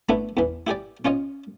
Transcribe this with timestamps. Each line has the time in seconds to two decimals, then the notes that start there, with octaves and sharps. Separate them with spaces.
0.09 A3 B3 D4 E4
0.37 E2 E3
0.67 E4 G4 G#4 D5
1.05 C#4 F4 C#5 D#5